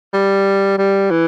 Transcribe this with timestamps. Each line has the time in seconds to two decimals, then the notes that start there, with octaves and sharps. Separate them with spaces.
0.13 G3
0.78 G3
1.10 E3